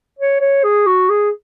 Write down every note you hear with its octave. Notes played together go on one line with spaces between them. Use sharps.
C#5
C#5
G#4
F#4
G#4